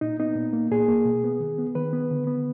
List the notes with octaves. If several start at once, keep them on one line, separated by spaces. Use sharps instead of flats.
A#2 D#4
B3 D#4
A#2
A#3
A#2 G#4
A#3
B2
B3
D#3
B3
D#3 B4
B3
D3
B3